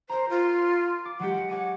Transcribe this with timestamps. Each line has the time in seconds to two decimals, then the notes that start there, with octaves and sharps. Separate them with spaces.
0.09 A#4 C5 A#5
0.29 F4
1.05 D6
1.20 F#3 G#3 G4 F#5
1.50 C#5 F#5 D6 D#7